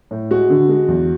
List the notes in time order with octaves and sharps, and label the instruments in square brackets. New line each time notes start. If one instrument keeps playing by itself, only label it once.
[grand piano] A2
G#3 F#4
D3
G#3
E2